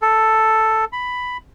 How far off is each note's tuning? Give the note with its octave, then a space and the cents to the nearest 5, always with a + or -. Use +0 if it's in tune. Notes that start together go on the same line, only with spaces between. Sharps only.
A4 +5
B5 +5